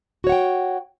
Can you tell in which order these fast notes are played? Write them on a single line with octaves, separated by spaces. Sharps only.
F#4 C#5 F#5 G5